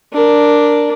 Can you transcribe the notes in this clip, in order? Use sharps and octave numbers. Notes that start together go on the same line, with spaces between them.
D4 A#4